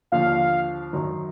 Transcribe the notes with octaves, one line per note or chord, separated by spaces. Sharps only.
D#2 D3 F3 F5
F#2 D#3 F#3